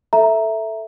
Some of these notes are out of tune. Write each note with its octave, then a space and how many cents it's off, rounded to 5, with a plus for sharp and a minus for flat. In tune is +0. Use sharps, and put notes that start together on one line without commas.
A4 +0 E5 +0 A#5 +0